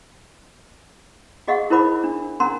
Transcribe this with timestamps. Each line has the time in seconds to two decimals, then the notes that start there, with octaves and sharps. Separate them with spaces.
1.48 F#4 G#4 D#5 F5 F#5 C#6
1.70 E4 A#4 C5 B5 D6
2.04 D4
2.40 C#4 D4 A#4 F#5 A#5 C6